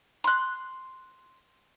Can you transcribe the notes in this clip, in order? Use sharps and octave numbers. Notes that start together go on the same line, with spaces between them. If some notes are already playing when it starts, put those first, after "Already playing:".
C6 F#6